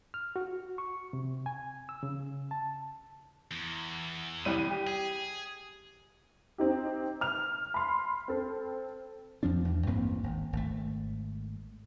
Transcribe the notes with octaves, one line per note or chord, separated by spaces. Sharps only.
F6
F#4
C#6
C3
G#5
E6
C#3
A5
E2
C2 G3 D#7
G4
G#4
C4 D#4 G4
F6 F7
B5 C6
C4 A4
F2 F3 C4 D4
E2
A1 G2 A#3 C4
G#1
G#1 A3